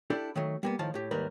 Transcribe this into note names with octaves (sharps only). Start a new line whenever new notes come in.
D4 E4 G4 A4 D5
D#3 F#3 A3
G3 A#3 B3
A2 D#3 F3 F5 A5
A2 G4
D#2 G#2 G3 A#4 B4